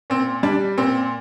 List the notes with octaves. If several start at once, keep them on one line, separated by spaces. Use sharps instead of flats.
A#2 C4
G3 D4
A#2 C4